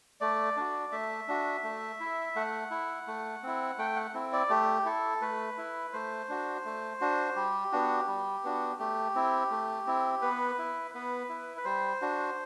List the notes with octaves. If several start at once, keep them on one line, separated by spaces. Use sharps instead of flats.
A3 D5
D4 F#4
A3 E5
D4 F#4
A3
E4
A3 F#5
E4
A3
C4 E4
A3 G5
F#5
C4 E4
D5
A3 G4
E4 A4
A3 B4
E4
A3 C5
D4 F#4
A3
D4 F#4
G3 G4
B3 D4 F#4
G3
B3 D4 F#4
A3 G4
C4 E4
A3
C4 E4
B3 B4
E4
B3 B4
E4
B4
G3 C5
D4 F#4